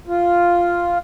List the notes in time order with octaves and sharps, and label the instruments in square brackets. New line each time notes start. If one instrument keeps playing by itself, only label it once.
[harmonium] F4